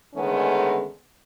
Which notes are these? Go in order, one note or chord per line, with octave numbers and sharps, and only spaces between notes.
D3 D#3 G#3 A3 B3 C#4